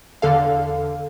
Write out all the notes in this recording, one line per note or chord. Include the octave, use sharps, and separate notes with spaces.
E2 D3 A4 F5